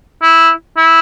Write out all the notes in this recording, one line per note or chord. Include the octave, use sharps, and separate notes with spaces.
E4
E4